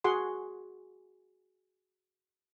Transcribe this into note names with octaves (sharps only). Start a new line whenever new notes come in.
F#4 G#4 F#5 C6